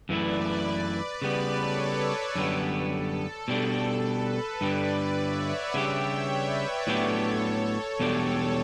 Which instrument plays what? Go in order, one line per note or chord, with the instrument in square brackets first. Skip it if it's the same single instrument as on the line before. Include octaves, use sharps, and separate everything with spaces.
[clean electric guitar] F#2 E3 A3 E4 [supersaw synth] B4 D5
[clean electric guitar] C#3 G3 B3 [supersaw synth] B4 D5
[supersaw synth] A4 C#5
[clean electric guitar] F#2 D3 G3 B3
[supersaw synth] A4
[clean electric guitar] B2 G3 D4
[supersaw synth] B4
[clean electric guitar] G2 D3 G3 [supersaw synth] B4 D5
[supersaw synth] C#5 E5
D5 F#5
[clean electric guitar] C#3 G3 D4 G4 [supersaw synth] E5 G5
[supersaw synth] C#5 E5
B4 D5
B4 D5
[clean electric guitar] A2 F#3 B3 D4 G4 [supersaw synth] A4 C#5
[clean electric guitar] E2 B2 G3 D4 G4 [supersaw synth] A4 C#5